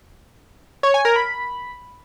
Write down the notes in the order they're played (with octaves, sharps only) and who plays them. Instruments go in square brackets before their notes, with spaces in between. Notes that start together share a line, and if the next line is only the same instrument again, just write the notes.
[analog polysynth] C#5
G#5
A#4
B5